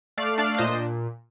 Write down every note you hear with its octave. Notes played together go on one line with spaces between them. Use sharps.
A3 D5 F5
D4 D5 F5
F5
A#2 C5 D#5